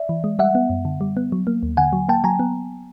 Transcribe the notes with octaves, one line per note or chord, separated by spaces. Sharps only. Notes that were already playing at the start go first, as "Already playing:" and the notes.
Already playing: D5 E5
E3
G#3
G3 E5 F#5
B3
F#2
D3
G3
B3
F#3
A#3
D#2
D3 F#5 G#5
F#3
A#3 G5 A5
F#3 G#5 A#5
B3